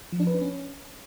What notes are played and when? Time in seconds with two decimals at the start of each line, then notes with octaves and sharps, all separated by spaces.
0.12 F3
0.20 D4
0.27 B4
0.34 D4
0.41 C#4